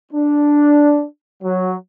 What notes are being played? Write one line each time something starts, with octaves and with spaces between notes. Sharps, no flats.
D4
F#3